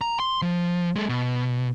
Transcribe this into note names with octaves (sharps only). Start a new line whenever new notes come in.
A#5
C6
F3
G#3 A4
B2